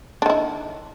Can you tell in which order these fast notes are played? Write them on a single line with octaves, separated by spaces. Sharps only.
D4 D#3 E4